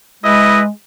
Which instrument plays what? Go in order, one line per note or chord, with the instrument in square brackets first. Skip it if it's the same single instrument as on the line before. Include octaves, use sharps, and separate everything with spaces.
[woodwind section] G#3 [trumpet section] E4 B4 D#5